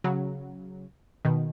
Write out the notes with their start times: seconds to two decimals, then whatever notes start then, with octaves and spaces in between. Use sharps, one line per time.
0.04 C#3 F#3
1.25 B2 D#3